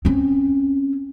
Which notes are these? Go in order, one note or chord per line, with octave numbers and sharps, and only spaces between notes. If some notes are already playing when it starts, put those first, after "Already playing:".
C4 C#4